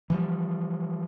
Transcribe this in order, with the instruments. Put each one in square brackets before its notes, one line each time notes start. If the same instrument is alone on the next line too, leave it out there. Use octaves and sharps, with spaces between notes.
[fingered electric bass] E3 F3 G3